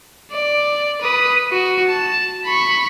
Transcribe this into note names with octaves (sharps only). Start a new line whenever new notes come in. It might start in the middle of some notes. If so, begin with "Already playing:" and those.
D5
B4 D#6
F#4
A5
B5 C#6